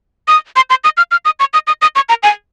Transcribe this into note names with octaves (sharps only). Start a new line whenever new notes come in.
D#6
C6
C6
D#6
F6
F6
D#6
C#6
D#6
D#6
D#6
C#6
A#5
G#5